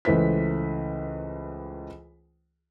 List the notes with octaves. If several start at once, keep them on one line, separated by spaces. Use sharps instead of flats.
C#2 E3 A3 B4 C5 B6